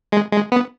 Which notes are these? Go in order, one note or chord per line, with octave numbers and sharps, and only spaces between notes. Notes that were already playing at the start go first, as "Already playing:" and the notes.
G#3
G#3
B3